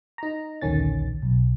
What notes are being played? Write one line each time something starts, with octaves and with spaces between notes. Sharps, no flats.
D#4 A#5
A#1 D#2 D3 D#3 C#4 A6
B1